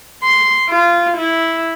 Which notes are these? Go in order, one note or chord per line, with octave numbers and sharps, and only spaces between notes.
C6
F4
E4